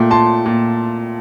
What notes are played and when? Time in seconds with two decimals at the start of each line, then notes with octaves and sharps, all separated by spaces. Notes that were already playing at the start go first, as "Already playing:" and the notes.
Already playing: A#2 A3 G5
0.11 A#2 A5 C6
0.46 A#2